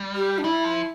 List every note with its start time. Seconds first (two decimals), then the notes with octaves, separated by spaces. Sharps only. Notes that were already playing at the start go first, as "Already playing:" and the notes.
Already playing: G3
0.16 G4
0.38 D4
0.45 G3 E4
0.64 F3